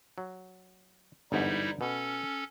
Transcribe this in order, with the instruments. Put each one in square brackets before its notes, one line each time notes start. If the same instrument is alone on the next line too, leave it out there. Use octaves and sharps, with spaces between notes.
[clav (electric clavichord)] F#3
[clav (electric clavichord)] G1 E2 G#2 [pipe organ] G3 D#4 E4
[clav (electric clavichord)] B2 [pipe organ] C#4 A4